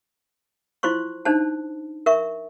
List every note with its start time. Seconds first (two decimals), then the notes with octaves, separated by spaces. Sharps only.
0.83 E4 F4 C5 C6 C#6
1.25 D4 D#4 C5 A5
2.06 A#4 E5 C#6